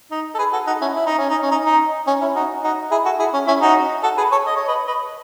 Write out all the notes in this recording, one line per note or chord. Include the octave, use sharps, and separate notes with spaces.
D#4
A4
G#4 B4
F#4 A4
D#4 F#4
C#4 E4
E4
D#4
C#4
D#4
C#4
D#4
D#4
C#4
C#4 E4
D#4 F#4
D#4 F#4
E4 G#4
F#4 A4
E4 G#4
C#4
C#4 E4
D#4 F#4
F#4 A4
G#4 B4
A4 C#5
D#5
C#5
B4 D#5
B4 D#5